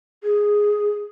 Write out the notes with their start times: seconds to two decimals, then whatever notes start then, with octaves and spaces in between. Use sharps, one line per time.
0.23 G#4